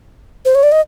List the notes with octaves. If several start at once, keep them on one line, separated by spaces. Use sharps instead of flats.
C5
C#5
D5
D#5